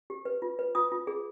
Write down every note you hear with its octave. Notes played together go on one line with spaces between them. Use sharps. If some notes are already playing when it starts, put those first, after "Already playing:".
G4
B4
F4
B4
F4 D#6
F4
G#4